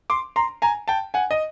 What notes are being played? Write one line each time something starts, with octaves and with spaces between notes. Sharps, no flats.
C6 D6
A#5 C6
G#5 A#5
G5 A5
F#5 G#5
D#5